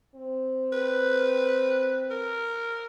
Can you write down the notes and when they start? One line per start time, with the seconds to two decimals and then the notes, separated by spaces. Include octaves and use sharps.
0.15 C4
0.72 B4
2.11 A#4